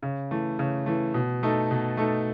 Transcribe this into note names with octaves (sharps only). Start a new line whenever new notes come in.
C#3
E3 A3
C#3
E3 A3
B2
A3 D#4 A4
B2
A3 D#4 A4